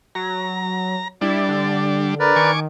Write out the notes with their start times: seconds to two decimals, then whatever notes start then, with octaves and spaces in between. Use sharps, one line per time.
0.15 F#3 A#5
1.21 G3 D4 E4 D5
1.49 D3
2.20 A#4 B4 D5
2.36 D#3 G#5 C#6 D6